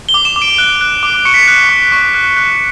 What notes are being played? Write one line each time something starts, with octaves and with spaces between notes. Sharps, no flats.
G7
D6
E7
D6
D7
F#6
F#6
D6
C#6 C#7
B6
F#6 C#7
C#6
C#6
F#6
F#6